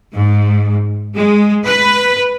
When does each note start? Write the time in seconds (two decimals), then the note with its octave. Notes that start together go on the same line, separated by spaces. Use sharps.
0.15 G#2
1.14 G#3
1.65 B4